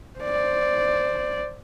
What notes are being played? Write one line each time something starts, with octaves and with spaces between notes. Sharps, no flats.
C5 D5